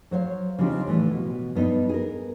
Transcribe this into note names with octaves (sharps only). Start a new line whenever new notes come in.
F#3 C5 C#5 F5
C#3 F3 G3 C4 D4 D#4
A2 E3 G3
B2
G2 B3 D#4
G#4 A#4